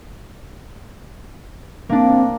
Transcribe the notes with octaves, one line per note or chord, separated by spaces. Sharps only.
A#3 C4 D4